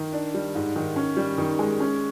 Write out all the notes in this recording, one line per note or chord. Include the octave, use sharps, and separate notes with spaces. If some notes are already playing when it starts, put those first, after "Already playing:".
Already playing: D#3
D4
G3
G#2
D#3
C#4
G3
D#3
G#3
C#4